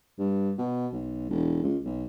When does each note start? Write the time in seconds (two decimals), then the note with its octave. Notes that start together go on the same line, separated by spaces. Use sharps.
0.19 G2
0.59 B2
0.93 B1
1.30 E1
1.63 C#2
1.85 B1